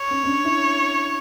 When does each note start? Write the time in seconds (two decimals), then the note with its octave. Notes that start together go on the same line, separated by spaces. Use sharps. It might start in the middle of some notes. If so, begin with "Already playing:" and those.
Already playing: C#5
0.11 C#4
0.24 C#4
0.27 D4
0.45 E4